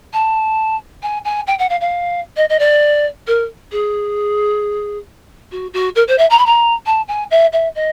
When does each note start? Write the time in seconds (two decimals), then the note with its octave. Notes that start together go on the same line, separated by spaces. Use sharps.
0.13 A5
1.03 G#5
1.25 G#5
1.47 G5
1.59 F#5
1.70 F5
1.81 F5
2.37 D#5
2.49 D#5
2.59 D5
3.27 A#4
3.72 G#4
5.52 F#4
5.74 F#4
5.96 A#4
6.08 C5
6.18 E5
6.30 A#5
6.38 B5
6.46 A#5
6.86 A5
7.08 G#5
7.31 E5
7.53 E5
7.75 D#5